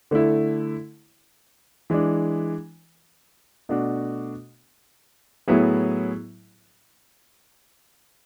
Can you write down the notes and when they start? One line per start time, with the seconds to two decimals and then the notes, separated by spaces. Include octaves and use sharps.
0.11 D3 A3 E4
1.90 E3 G#3 D4
3.69 B2 A3 D4 F#4
5.48 A2 F#3 B3 E4 G#4